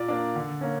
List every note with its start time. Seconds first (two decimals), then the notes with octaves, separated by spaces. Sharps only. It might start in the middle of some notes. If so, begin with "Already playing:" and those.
Already playing: A#2 D5
0.08 A#3 D4
0.36 D3
0.61 A#3 C#4